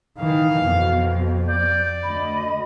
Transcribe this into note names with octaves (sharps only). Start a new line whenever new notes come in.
D#3 E3 F5
F2 B2
D5 G6
D2 D#5 B5